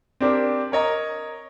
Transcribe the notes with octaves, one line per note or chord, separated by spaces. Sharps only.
C4 D4 G4 A#4 D5
A#4 C#5 D#5 A#5